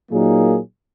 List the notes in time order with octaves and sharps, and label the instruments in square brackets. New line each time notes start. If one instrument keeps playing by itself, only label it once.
[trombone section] A#2 F#3 A#3 D#4 G#4